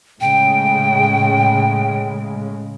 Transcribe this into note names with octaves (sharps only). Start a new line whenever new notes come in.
A2 C#3 G#3 G5